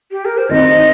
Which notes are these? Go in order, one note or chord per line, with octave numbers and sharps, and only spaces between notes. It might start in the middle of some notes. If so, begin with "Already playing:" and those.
G4
A#4
C5
D#3 C4 D#4 D#5